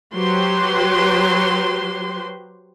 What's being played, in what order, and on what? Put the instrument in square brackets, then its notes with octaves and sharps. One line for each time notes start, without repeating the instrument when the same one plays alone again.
[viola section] F#3 G4 B4 C5 C6